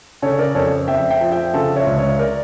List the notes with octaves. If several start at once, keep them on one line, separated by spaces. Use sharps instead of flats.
C#3 A4 C#5
A#4 D5
F2 A4 C#5
F2 E5 G5
E5 G5
F3
E5 G5
C#3 F4 A4
C#5 E5
C#2
C#5 E5
A#4 D5